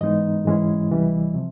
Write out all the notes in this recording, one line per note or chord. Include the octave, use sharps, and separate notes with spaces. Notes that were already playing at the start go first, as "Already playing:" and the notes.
G#2 E3 G#3 B3 D#4 D#5
G#2 E3 G#3 C#4 E4
D2 C3 E3 G3
C3 F3